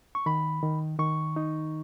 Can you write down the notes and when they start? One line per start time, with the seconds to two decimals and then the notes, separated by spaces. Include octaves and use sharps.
0.15 C#6
0.26 D#3 B5
0.63 D#3
0.99 D#3 C#6
1.36 D#4